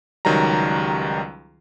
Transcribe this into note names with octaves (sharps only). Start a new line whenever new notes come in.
C#2 D#3 F#3 G3 A#5